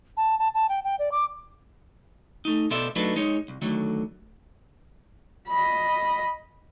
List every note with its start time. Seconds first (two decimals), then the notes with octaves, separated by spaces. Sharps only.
0.17 A5
0.39 A5
0.54 A5
0.69 G5
0.84 G5
0.99 D5
1.12 D6
2.45 A3 D#4
2.70 B2 B3 A4 C5 D5 E5
2.96 F#3 A3 D4 D#4 B4
3.16 G#3 D#4 C#5
3.48 C2
3.62 D3 D#3 F#3 A3
5.48 D#5 B5